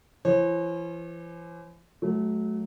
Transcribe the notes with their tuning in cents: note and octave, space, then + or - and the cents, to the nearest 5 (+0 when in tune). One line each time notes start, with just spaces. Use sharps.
E3 +40 C#5 -45
F#3 +0 A3 -30